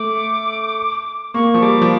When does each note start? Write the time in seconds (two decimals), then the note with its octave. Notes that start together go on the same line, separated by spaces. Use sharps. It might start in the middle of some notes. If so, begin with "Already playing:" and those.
Already playing: A3 D6
1.34 A#3 C#6
1.54 F3
1.62 G3 D6
1.82 F3